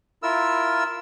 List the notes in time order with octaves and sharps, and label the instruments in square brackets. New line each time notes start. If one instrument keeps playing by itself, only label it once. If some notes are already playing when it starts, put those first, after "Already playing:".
[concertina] E4 F4 A#4 E6